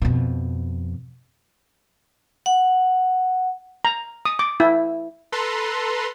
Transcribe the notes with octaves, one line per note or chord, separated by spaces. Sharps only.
F2 B2
F#5
A#5
D#6
D6
E4
A4 B4 A#5 C6